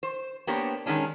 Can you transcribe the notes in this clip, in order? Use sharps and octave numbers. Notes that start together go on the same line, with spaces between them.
C5
A#3 B3 D4 G4 C5 C#5
D#3 E3 G#3 C#4 D4